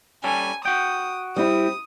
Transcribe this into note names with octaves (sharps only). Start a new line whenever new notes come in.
G3 C#4 A4 G#5
F#4 G5 D#6
G3 C4 E4 D#6